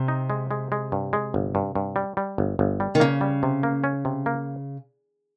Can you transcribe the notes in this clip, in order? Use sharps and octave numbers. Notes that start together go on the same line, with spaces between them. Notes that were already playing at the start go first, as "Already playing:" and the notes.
Already playing: C3
D#4
G#3
G#3
G#3
G2
G#3
G1
G2
G2
G3
G3
G1
G1
G3
D#3
C#3 A#3
G3
C3
A#3
C#4
C3
A#3